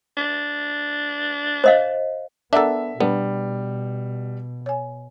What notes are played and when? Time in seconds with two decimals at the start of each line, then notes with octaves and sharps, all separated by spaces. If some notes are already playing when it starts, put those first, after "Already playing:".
0.17 D4
1.64 C5 D#5 F5
2.53 B3 D4 A4 A#4 E5 F#5 A#5
3.00 B2 G3 B3 D4
4.66 C#5 G#5